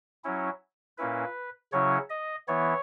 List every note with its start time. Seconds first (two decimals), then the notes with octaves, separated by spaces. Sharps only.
0.24 F#3 C#4 E4
0.98 A#2 A#3 C#4 E4 B4
1.72 C#3 F#3 C#4 E4 C#5
2.10 D#5
2.48 E3 B3 E4 C#5